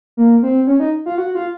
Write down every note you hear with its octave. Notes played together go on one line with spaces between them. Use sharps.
A#3
C4
C#4
D#4
F4
F#4
F4